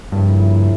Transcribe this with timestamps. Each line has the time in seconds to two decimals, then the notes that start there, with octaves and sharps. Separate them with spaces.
0.12 G2 C#3 F3 A#3 C#4 E4